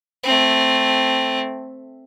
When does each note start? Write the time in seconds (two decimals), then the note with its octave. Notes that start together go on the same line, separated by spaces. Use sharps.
0.23 A3 C4